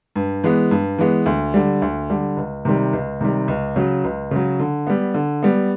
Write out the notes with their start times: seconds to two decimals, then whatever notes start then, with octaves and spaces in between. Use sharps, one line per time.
0.16 G2
0.44 E3 G#3 B3
0.71 G2
0.99 E3 G#3 B3
1.26 D2
1.54 D3 G3
1.82 D2
2.10 D3 G3
2.37 C#2
2.65 C3 D#3 G3
2.93 C#2
3.21 C3 D#3 G3
3.48 C#2
3.76 C#3 F#3
4.04 C#2
4.31 C#3 F#3
4.60 D3
4.87 G3 B3
5.14 D3
5.43 G3 B3